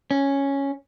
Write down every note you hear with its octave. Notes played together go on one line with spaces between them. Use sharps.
C#4